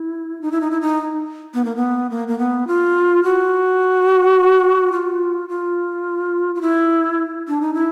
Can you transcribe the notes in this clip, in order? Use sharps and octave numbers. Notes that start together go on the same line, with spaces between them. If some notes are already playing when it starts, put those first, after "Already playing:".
Already playing: E4
D#4
E4
D#4
E4
D#4
B3
A#3
B3
A#3
A#3
B3
F4
F#4
F4
F4
F4
E4
D4
D#4
E4